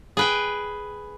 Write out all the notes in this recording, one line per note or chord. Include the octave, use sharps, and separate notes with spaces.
G#4 B4 G5